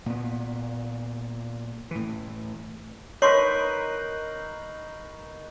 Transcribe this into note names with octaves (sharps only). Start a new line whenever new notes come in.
A#2 B3
A2 E3
D#4 A#4 B4 C#5 C6 C#6 C7 F#7